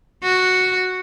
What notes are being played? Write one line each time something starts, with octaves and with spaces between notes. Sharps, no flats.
F#4